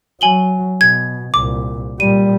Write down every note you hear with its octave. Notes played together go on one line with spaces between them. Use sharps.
F#3 G#5 F#7 G7
B2 G#6
C2 A#2 D6
A#2 G3 D#7